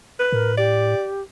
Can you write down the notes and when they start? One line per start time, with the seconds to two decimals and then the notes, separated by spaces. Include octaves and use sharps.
0.19 B4
0.32 A2 A#4
0.57 G4 D5